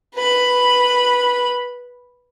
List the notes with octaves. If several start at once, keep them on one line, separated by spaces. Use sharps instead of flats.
B4 B5